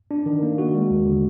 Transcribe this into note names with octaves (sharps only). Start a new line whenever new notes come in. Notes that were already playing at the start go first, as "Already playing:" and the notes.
D4
D#3
A#3
F#4
G#3
D#2
D3